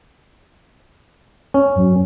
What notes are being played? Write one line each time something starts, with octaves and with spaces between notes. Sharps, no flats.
C#4
F#2